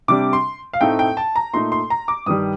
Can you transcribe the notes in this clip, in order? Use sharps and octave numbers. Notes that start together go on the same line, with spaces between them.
C3 G3 D4 D6
C6
F5
A2 A3 C4 D#4 G5
G5
A5
A#5
A#2 A3 D#4 C6
C6
A#5
D6
G2 D#3 G3 D#6